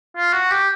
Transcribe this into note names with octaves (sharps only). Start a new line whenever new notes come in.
F4
F#4
G4